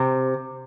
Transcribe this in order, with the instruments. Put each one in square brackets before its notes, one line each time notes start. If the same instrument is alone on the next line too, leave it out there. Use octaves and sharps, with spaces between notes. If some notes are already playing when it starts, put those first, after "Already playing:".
Already playing: [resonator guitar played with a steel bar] C3